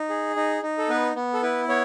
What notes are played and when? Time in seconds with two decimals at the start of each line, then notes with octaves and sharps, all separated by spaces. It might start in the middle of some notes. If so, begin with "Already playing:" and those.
Already playing: D#4
0.10 G#4
0.36 D#4
0.62 D#4
0.78 A4
0.89 B3 B4
1.15 B3
1.34 A4
1.43 E4 B4
1.68 B3 C#5